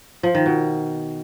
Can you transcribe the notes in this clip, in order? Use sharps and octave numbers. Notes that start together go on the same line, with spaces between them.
F3
D#3
B2